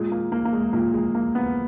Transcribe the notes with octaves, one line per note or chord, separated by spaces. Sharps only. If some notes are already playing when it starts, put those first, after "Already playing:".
Already playing: A#2 G#3
A#3
A#3
A#3
G#3
A#2 A#3
G#3
A#3
B3